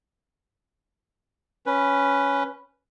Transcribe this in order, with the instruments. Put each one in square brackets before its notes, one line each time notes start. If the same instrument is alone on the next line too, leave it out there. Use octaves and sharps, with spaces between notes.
[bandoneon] C#4 B4